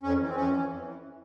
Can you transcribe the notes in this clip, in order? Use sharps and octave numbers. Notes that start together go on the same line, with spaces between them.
F2 C#4
E3
C4
F2 C#4
E3
F2
E3